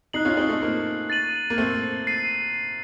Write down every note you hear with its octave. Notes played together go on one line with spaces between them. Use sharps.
D#4 F#6 C7 F#7
C#4 F4
C4 D#4
A3
A#3
A6 D#7 F#7
A#3
A3 C4
A6 C7 D#7